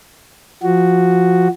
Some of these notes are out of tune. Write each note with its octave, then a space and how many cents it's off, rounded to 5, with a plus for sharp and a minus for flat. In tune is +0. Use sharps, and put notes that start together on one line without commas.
F3 +0 F#4 +0